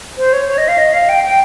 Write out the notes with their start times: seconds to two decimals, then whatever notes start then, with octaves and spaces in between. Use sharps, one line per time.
0.17 C5
0.33 C#5
0.48 C#5
0.58 D#5
0.68 F5
0.78 D#5
0.93 F5
1.09 G5
1.24 G5